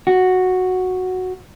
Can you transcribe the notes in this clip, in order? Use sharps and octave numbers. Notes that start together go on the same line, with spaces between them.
F#4